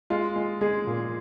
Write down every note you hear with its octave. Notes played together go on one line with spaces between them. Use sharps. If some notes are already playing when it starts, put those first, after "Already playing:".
G#3 F4
G#3
G#3 G#4
A#2